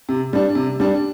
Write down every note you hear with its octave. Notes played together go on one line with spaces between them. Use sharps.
C3
G3 D4
C3
G3 D4